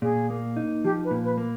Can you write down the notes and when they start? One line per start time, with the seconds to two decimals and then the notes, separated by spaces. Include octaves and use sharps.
0.02 A#2 G#4
0.30 A#3
0.56 D#4
0.84 F3 G4
1.04 B4
1.11 A#2
1.24 B4
1.38 A#3